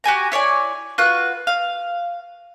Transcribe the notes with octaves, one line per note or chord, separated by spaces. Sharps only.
F#4 G4 G#5 A#5
E4 C#5 D5 G#5
F4 F#4 B4 F#6
F5